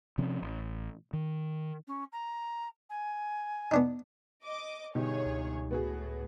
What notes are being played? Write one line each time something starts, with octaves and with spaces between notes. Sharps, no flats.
C3 F3 C4 C#4
A1
D#3
C#4
A#5
G#5
B3 D4 D#4
D#5 D6
G1 B2 D#4 G4 G#4 C#5
C#2
A2 B3 F#4 G#4